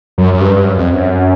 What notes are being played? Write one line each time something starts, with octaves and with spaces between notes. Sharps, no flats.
F#2
F#2
G2
G2
F#2
F2
F#2